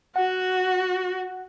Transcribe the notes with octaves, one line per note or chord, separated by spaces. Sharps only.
F#4 F#5